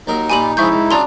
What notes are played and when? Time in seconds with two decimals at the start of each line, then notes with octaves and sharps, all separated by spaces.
0.07 D#2 F#3 D#4 A#4
0.30 A#2 F4 G4 G#5 B5 D#7 F#7
0.57 C#3 F3 G#3 E4 E5 C#6 G6
0.72 C#2
0.91 C#3 F#3 D4 F4 D5 A#5 C6